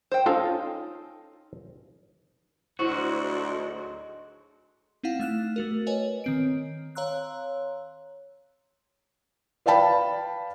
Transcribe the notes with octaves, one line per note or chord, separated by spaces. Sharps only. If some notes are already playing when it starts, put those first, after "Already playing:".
C5 G5
C#4 D#4 F4 A4 F5
D2 G#2 F#3 E4 F#4 C5
C4 D#4 E4 F5 F#5
A3 F6 F#6 E7
A3 F#4 A#4
A#4 B4 C#5 D#5 G#5
D#3 C4 D7
C#5 F5 A#5 C6 E6 F#6
B4 D5 F5 G5 A5 B5